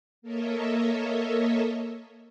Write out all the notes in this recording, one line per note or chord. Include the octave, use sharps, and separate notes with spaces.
A#3 A4 A#4 C#5 D#5 E5